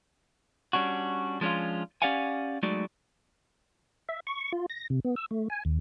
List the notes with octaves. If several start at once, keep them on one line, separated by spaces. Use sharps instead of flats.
G3 C#4 D4 F#4
F3 G#3 C#4 D4 F4
C#4 G4 D5 F5 F#5 G#5
F#3 G#3 A3 D#4 F#4 D5
E5
C#6
F4
A#6
C3
B3
E6
A3
G#5
D#2